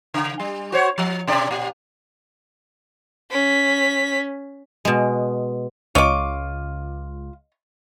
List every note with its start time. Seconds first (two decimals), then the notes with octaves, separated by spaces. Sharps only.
0.14 C#3
0.40 G3
0.72 F#4 C5 C#5
0.98 F3
1.27 B2 C#4 D5
1.51 A#2 G4
3.31 C#4 B6
4.85 B2 G#3
5.95 C#2 F4 C#5 D#5 D6